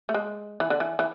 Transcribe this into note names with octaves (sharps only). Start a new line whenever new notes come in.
A3
G#3
E3
D3
E3
E3